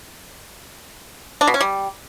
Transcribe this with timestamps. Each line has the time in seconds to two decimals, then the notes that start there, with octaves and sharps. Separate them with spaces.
1.41 D4
1.47 B2
1.54 C#4
1.61 G3